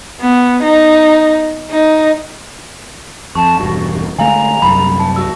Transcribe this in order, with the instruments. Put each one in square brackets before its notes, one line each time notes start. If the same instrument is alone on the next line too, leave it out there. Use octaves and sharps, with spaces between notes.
[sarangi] B3
D#4
D#4
[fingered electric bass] F2 [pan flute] A5 [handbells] C#6
[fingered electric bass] E1 G2 [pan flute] F#4
[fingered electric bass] D3 G#3 A3 [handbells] F5 G#5 [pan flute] A#5
[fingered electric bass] C2 F#2 [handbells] B5
[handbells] A5
[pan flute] F#4 [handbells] E6